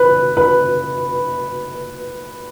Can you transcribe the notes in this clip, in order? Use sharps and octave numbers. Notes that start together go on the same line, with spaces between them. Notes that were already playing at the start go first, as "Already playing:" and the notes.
Already playing: B4
B4